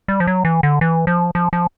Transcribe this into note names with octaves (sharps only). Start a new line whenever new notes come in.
G3
F3
F#3
E3
D3
E3
F3
F3
F3